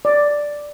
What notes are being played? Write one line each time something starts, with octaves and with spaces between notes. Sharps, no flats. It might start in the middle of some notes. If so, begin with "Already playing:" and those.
D5